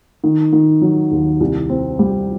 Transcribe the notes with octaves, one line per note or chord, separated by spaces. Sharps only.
D#3
D#3
F#3
D#2
C2
C4
G3